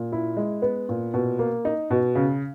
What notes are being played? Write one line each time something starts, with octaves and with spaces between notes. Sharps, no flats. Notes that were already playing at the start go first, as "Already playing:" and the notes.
Already playing: A#2
E4
G#3
B3
A#2
B2
A#3
D#4
B2
C#3